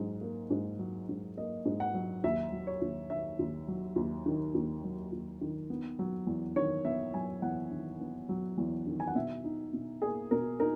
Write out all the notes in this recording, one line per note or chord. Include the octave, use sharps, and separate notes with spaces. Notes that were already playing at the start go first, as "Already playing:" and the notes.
Already playing: G#2 F#3
A#3
G#2
F#3
G#2
A#3 D#5
G#2
F#5
F#3
D#2 E5
F#3
C#5
D#2
D#3 E5
D#2
F#3
D#2
D#3
D#2
F#3
D#2
D#3
B3
F#3
E2
D#3 C#5
B3 E5
F#3 G#5
E2 F#5
D#3
B3
F#3
E2
D#3
G#5
F#5
B2 E5
D#4
B2
A#3 G#4
B2 A#4
D#4 A#4